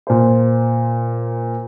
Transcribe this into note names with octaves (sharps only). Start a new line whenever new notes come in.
A#2 C5